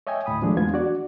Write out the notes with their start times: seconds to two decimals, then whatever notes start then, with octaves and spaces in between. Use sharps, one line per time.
0.07 C#5 D#5 E5 G5 G#5
0.26 D2 A2 B5 D#6
0.42 D#3 F3 G#3 A3 D4 G#4
0.57 E2 B3 F4 G#6
0.73 D4 F#4 D5